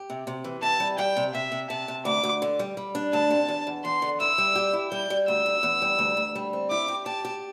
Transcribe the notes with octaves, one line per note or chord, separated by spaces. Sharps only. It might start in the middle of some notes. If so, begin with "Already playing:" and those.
Already playing: G4
C3
C3
E3
C3 A5
G3
G3 G5
C3
C3 E5
C3
C3 A5
C3
D2 D6
D2
D3
G3
G3
D4
D2 A5
C3
E2
E2
E2 C6
D3
E4 E6
G3
G4
E4
G3 G6
G3
D2 E6
D2
E2
G3
D2
D2
G3
C4
E4 D6
G4
G4 A5
G4